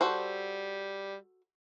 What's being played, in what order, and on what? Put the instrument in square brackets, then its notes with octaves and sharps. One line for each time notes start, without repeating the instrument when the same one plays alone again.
[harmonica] G3 [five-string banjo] F#4 A4 C5